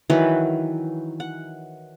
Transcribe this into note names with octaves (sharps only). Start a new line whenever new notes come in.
D#3 E3 F#3 B4
F#5